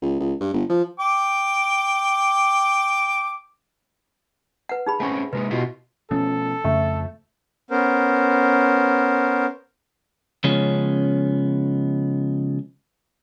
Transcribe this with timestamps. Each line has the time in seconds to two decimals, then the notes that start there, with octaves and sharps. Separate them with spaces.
0.02 C#2
0.20 C#2
0.40 G2
0.54 G1
0.70 F3
0.99 G5 D6
4.69 B4 F#5
4.86 D#4 G#4 B5
5.00 A3 C4 C#4 F#5 G#5 C#6
5.33 C3 G#3 D#4 B4
5.51 B2 E4 F4 G4
6.11 B2 F3 A3 C#4 A4
6.65 F2 C#3 A3
7.71 B3 C#4 A#4 C5
10.44 C#3 F3 G#3 B3 C#4